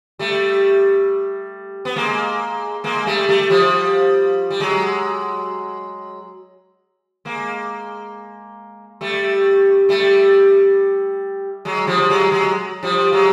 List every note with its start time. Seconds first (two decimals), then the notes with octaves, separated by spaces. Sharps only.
0.19 G3 A3
1.85 B3
1.96 G#3 A#3
2.84 G#3 A#3
3.07 G3 A3
3.29 G3 A3
3.50 F3 G3
4.50 G3
4.60 F#3 G#3
7.25 G#3 A#3
9.01 G3 A3
9.89 G3 A3
11.65 F#3 G#3
11.87 F3 G3
12.10 F#3 G#3
12.32 F#3 G#3
12.83 F3 G3
13.13 F#3 G#3